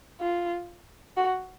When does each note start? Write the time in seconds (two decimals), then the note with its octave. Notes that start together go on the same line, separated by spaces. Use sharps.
0.21 F4
1.17 F#4